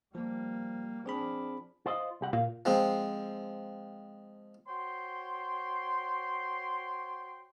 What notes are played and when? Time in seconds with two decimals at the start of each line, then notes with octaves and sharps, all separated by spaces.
0.15 F3 G3 A#3
1.06 F3 C4 D4 G#4 B5
1.86 F4 C5 D#5
2.21 C2 G4 F#5
2.33 A#2 F5
2.65 F3 G#3 C4
4.68 F#4 C5 C#5 G5 C6